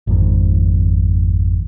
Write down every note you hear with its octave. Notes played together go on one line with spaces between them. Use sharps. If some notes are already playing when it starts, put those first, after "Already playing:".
G#1 F2 D#3